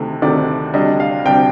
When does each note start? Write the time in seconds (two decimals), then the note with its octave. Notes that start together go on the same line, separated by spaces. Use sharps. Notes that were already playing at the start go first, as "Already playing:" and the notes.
Already playing: D2 C3 D#3 A3
0.22 D2 C3 D#3 A3 D5
0.74 D2 C3 G3 D4 D#5
1.00 F5
1.25 D2 C3 G3 D4 G5